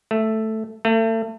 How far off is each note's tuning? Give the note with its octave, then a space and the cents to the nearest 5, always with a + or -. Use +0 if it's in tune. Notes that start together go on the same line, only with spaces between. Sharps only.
A3 +0
A3 +35